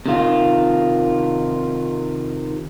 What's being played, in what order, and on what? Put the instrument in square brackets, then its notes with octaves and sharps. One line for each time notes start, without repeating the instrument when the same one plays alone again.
[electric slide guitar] C3 D#3 F4